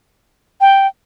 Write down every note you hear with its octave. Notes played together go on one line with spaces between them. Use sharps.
G5